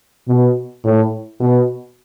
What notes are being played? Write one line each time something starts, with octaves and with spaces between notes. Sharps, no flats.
B2
A2
B2